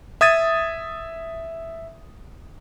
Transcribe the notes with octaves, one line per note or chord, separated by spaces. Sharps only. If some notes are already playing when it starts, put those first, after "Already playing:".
E5 D#6 G#6 A6 D#7